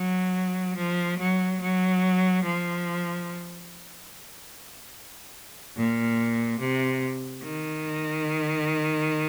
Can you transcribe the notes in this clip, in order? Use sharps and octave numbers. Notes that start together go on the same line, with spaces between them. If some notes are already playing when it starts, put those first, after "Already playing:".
Already playing: F#3
F3
F#3
F#3
F3
A#2
C3
D#3